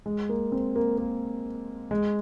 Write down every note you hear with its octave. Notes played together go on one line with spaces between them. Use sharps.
G#3
A#3
C4
A#3
A#3
G#3